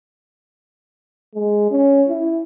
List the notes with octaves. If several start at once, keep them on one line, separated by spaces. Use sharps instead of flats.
G#3
C#4
E4